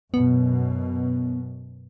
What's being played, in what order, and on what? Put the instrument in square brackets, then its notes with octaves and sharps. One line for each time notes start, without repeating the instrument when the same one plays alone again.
[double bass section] F#2 B2 [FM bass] B3